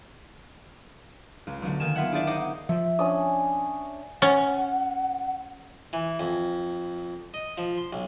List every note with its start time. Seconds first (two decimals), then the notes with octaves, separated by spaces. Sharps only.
1.47 C#2
1.62 B1 D3
1.80 D#3 A#3 G#5 E7
1.96 A#3 B3 F4 E5 F#5
2.12 D4 E4 G#4 C5 D5 E5
2.27 D#4 C5 D#5 F#5 D6
2.69 F3 E5
2.99 C#4 D4 D#6
4.22 C#4 F#5
5.93 E3
6.19 F2
7.34 D#5
7.58 F3
7.78 C6
7.93 B1